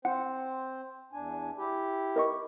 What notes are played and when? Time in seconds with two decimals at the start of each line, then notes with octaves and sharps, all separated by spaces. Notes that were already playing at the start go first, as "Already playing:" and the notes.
0.05 C4 C5 F#5
1.13 E2 D4 G#5
1.58 E4 G4
2.16 A#4 D#5 C#6